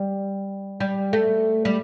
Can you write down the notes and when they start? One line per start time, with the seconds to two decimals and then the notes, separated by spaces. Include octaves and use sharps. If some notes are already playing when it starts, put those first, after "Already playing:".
Already playing: G3
0.80 G3
1.13 A3
1.65 G3